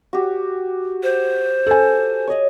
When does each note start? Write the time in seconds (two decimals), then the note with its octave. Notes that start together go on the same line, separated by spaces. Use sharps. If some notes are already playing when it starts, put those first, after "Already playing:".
0.13 F#4 G4
1.03 C5
1.67 A4 G#5
2.28 C#5 D#5